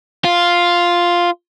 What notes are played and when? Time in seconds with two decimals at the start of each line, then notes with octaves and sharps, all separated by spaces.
0.25 F4